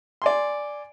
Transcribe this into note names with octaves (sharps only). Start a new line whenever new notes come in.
D5 G#5 C6